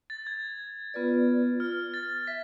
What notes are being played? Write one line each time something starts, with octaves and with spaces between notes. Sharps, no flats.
A6
G#6
B3 F4 B4 D5
F6
A6
E5 B6